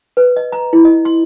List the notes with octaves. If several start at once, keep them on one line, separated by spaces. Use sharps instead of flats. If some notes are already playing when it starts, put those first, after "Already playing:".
B4
D#5
A#5
E4
D#5
C6